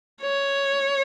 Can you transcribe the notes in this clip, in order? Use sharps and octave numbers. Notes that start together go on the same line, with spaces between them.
C#5